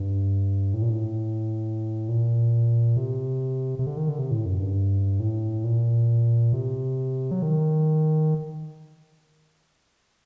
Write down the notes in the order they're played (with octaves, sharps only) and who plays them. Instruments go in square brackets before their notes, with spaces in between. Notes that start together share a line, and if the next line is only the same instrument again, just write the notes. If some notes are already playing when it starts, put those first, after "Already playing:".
Already playing: [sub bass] G2
A2
A#2
A2
A#2
C3
C3
D3
D#3
D3
C3
A2
F#2
G2
A2
A#2
C3
F#3
D#3